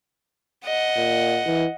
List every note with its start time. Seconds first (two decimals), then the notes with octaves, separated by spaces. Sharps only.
0.66 D#5 F#5
0.96 A#2
1.46 E3